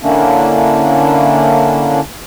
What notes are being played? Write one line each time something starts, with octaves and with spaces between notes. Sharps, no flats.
D3 A#3 C#4 D4 E4